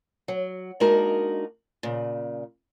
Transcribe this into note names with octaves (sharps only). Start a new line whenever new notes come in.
F#3
G#3 A#3 D4 D#4 F#4 A#4
A#2 C#3